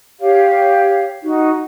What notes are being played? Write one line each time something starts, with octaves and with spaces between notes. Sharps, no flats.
G4 C#5 F5
D#4 F#4